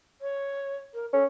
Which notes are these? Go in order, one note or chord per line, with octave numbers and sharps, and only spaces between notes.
C#5
A#4
C#4 A4